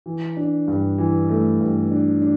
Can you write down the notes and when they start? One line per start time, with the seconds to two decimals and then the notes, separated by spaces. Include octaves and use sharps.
0.06 E3
0.37 D4
0.68 G2
0.98 E3
1.29 A3
1.60 G2
1.91 D4
2.22 D4